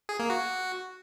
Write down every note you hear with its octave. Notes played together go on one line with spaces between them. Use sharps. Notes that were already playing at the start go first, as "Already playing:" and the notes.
G#4
A#3
F#4